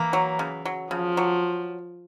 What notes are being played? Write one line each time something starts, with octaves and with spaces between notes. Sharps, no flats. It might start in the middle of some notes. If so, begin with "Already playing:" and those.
Already playing: E3 A#3
F#3
C#3
F#3
C#3 F3
F#3